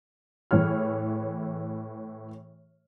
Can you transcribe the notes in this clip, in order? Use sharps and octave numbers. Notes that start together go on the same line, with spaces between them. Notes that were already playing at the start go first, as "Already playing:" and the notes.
A2 E3 G#4 C#5 F6